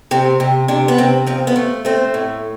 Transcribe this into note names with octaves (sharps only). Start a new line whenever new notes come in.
C3 C4
C3
C3 D4
B3
C3 C4
F3 C4
B3
A3
A3 C4
A2